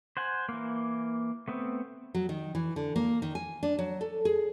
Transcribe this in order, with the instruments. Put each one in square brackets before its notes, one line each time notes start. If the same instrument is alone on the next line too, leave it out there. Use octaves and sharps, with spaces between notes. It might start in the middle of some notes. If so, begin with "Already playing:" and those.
[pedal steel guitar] C5 F#5 G#5
E3 A#3
A3 B3 C4
[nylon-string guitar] F#3
D#3
E3
D3
A#3
D#3
G#5
D4
F#3
A4
G#4